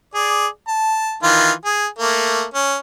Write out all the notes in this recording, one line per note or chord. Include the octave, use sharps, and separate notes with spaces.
G#4 D5
A5
D#3 E3 F4
G#4
A3 A#3
C#4